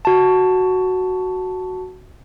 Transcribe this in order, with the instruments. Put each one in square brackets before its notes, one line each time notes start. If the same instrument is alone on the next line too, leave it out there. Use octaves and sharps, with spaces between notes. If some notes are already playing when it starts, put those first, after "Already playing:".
[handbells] F#4 A5